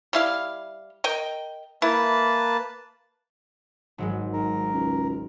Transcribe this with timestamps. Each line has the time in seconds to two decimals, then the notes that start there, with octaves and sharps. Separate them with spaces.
0.13 G3 E4 F5
1.04 A#4 D#5 G5
1.82 A#3 E4 B4 A5
3.98 G#1 F#3 G#3
4.33 G#2 A#4
4.73 C#2